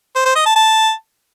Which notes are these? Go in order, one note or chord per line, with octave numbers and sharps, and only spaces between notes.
C5
C5
D#5
A5
A5